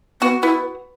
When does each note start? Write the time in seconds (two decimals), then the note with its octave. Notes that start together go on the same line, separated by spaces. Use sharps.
0.21 B3 F#4
0.43 B3 E4